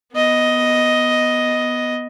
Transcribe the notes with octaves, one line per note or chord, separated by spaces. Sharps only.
B3 D#5